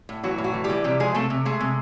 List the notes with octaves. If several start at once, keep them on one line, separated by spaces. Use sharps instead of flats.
A2
E3 F#3 F#4
A2
F#3 F#4
E3
G3 G4
E3
C3 G3 G4
F3 G#3 G#4
C3 A3 A4
C3
G#3 A3 G#4
C3